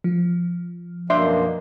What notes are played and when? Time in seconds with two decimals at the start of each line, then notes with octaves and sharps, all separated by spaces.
0.04 F3
1.10 F#2 B2 A#3 D4 C5 E5